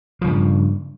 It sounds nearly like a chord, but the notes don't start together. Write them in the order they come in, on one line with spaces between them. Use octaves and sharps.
F3 C#3 G2